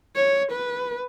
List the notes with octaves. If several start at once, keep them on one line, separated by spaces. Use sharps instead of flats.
C#5
B4